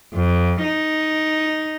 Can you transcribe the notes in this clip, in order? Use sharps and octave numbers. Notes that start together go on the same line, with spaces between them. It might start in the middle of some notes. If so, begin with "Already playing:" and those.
F2
D#4